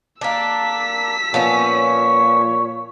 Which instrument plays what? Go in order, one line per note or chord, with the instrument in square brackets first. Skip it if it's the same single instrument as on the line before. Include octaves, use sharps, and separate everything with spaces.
[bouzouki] A#3 D4 [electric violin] E6 B6
[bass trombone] A#2 [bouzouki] F3 B3 C#4 [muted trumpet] C#5